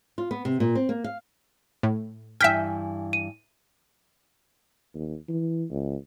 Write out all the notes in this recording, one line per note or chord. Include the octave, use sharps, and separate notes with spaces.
F4
B3
C3
A#2
C4
A#3
F5
A2
G2 E3 E5 G5 G#5 F6 G6 B6
D#7
D#2
E3
C#2